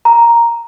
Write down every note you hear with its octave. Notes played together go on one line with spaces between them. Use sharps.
A#5